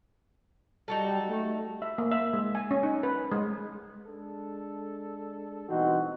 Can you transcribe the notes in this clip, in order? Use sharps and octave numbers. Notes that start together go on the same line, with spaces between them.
G3 D#4 F#4 A4
A3
E5
A#3
E5
G#3
G#5
C#4
D#4
B4
G#3
G#3 D4 A4
B2 E3 G3 C4 D#4 F#4